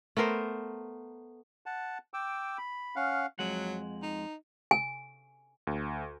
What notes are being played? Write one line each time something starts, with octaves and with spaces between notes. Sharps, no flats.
A3 B3 A#4 C5
F#5 A5
G5 D6 E6
B5
C#4 F5 F#5
F2 F#3 G#3 F#5
D#4
G#5
D2